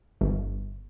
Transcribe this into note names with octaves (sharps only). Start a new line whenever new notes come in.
G1